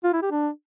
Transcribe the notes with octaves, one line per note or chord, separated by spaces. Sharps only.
F4
E4
G4
D4